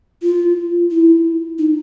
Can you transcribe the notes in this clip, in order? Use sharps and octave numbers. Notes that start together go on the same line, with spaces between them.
F4
E4
D#4